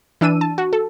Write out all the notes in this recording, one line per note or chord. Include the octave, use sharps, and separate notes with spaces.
E3 D4 E6 D#7
A5
F#4
A4